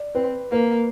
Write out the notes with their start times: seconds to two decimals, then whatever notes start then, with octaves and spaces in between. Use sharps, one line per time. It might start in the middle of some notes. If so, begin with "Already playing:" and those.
Already playing: D5
0.15 C4 B4
0.52 A#3 B4